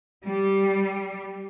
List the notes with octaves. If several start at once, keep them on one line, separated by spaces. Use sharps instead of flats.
G3